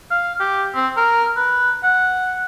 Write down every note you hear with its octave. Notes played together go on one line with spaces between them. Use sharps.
F5
G4
C4
A#4
B4
F#5